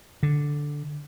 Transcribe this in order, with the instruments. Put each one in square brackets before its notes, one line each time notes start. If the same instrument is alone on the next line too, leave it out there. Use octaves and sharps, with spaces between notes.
[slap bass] D3